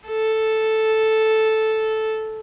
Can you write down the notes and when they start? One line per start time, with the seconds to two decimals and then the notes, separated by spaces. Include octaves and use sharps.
0.09 A4